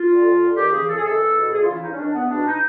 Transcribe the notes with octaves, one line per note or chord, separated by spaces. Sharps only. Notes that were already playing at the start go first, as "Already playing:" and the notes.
Already playing: F4
D3
F2
D3
D#2 G4
C#3 E3 G#4
F2 A4
G#4
C3 D#3 A4
E2
B2
D2 G#4
F4
C#3 E3
E4
G2 D#4
C#4
D#3 D4
E2 B3
B2 D4
D#4